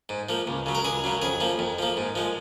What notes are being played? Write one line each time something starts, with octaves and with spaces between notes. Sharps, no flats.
G#2
F3 A#3
C#2
C#3 F#3
A#4
C#2 G#4
C#3 F#3
F2 G#4
F3 A#3
F2
F3 A#3
G#2
F3 G#3